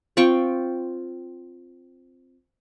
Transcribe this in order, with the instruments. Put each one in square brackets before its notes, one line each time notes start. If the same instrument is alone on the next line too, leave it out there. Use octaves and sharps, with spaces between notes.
[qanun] C4 F4 G5 C#6